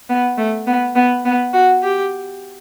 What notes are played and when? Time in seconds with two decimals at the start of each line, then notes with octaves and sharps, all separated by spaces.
0.09 B3
0.38 A3
0.67 B3
0.96 B3
1.25 B3
1.53 F#4
1.83 G4